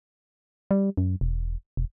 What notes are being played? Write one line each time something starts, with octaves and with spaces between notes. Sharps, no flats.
G3
F#2
E1
E1